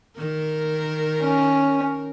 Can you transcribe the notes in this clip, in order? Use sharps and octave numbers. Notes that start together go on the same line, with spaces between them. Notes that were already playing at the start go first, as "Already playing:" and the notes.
D#3 A#4
C#4